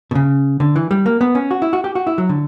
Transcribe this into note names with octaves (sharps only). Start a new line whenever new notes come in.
B2
C#3
D3
E3
G3
A#3
B3
C#4
F#4
E4
F#4
G4
F#4
E4
F#3
D3